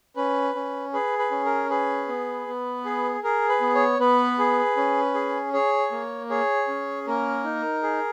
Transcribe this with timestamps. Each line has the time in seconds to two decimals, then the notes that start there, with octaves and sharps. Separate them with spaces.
0.16 C#4 B4
0.55 C#4
0.93 G#4 B4
1.19 B4
1.31 C#4
1.45 A#4
1.70 G#4 B4
2.08 B3
2.47 B3
2.85 G#4
3.24 G#4 A#4
3.49 B4
3.61 B3
3.75 C#5
3.99 B3 B4
4.39 G#4
4.77 C#4
5.15 G#4
5.53 G#4 C#5
5.92 A#3
6.30 G#4 C#5
6.68 C#4
7.07 A#3 A#4
7.44 D#4
7.83 G#4